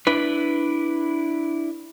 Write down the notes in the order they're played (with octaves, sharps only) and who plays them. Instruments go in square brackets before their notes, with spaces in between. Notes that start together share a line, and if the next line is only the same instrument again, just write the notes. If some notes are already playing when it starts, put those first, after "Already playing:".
[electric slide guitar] D4 E4 B4